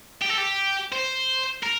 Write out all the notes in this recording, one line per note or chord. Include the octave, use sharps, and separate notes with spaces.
G4
A4
G4
C5
A#4